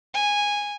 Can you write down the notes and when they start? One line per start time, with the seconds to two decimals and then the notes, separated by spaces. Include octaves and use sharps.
0.14 G#5